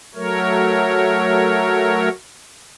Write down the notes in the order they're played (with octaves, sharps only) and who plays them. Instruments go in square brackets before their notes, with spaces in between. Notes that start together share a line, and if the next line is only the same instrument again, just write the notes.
[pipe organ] F#3 A3 A#4 C#5